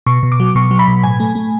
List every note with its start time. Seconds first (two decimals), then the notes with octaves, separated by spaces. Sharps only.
0.06 B2 C#6
0.23 B2
0.32 D6
0.40 F#3
0.55 B2 C#6
0.71 F#3
0.79 B5
0.88 B2
1.03 A2 G#5
1.20 A3
1.35 A3